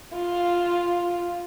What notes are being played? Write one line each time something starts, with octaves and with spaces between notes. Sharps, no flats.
F4